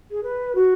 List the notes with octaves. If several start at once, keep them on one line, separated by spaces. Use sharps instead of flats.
G#4
B4
F#4